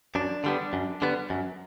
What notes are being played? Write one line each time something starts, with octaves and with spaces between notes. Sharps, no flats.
F#2 D4
D3 G3 B3
F#2
D3 G3 B3
F#2